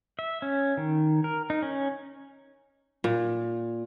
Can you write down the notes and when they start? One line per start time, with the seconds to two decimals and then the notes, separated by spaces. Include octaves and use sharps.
0.19 E5
0.42 C#4
0.77 D#3
1.24 A#4
1.50 D#4
1.63 C#4
3.04 A#2